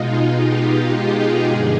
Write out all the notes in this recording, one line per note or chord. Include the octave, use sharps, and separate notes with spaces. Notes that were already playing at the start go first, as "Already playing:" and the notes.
Already playing: B2 G#3 D#4 F4
G4
G#4
G2 D3 F3 G#3